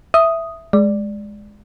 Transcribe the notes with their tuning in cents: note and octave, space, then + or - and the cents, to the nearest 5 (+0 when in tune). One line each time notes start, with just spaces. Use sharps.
E5 +0 D#6 +0
G#3 +0 D5 +0